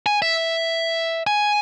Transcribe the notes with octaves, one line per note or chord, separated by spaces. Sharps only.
G#5
E5
G#5